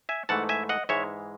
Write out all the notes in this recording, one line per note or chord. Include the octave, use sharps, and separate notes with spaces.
E5 G#5
G#2 E3 A3 F#5 A5
E5 G#5
D#5 F#5
G#2 E3 G#3 C#5 E5